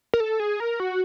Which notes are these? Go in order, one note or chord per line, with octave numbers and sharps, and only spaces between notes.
A#4
A4
G#4
A#4
F#4